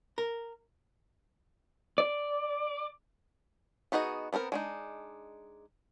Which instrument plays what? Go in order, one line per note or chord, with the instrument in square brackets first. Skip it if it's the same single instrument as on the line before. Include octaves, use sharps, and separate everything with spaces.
[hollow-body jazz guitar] A#4
[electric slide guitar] D5
[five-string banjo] B3 D#4 F#4 G#4 D#5
B3 C4 A4 A#4
G#3 D4 D#4